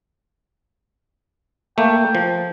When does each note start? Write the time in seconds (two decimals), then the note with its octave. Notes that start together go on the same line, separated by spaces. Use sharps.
1.78 A3 A#3 G5
2.15 F3